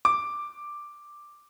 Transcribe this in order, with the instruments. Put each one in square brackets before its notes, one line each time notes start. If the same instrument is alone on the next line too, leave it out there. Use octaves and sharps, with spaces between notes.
[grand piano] D6